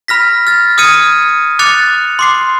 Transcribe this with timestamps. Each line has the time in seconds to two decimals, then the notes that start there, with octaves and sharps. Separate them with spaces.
0.08 B5 F6 A#6 B6
0.47 F6 A6
0.78 D#6 F6 G#6 C#7 D#7
1.59 D6 F#6 A6 C#7 F7
2.19 C6 D6 C7